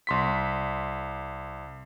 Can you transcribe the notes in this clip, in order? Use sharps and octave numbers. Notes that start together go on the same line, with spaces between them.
C2 C6 B6